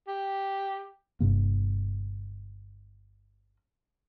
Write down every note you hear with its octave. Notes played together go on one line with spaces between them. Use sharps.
G4
G1 G2 C3 A#3